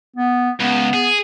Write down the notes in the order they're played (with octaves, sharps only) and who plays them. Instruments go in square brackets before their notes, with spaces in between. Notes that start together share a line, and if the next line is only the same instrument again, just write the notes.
[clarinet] B3
[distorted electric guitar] C#2 [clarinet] B3
[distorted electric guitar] G#4